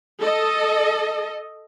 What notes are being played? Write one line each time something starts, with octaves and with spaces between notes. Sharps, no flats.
A4 D#5